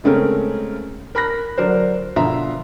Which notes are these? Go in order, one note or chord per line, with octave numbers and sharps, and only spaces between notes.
C#3 G#3 A3 C4 C#4 A#4
A#4 B5 F#6 A#6
D3 F#3 D4 A#4 C5
B2 D3 F3 E5 A#5 C6